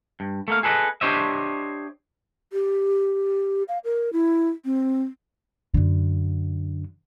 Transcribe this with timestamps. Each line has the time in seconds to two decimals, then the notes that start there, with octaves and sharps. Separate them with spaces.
0.20 G2
0.48 A3 A#3 F5
0.63 G#4 A4 B4 D5 D#5
1.01 D4 G4 C5 C#5 D#5 E5
2.53 G4
3.68 F5
3.84 A#4
4.13 E4
4.65 C4
5.74 F#2 D3